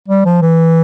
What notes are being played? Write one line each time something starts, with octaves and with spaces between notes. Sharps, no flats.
G3
F3
E3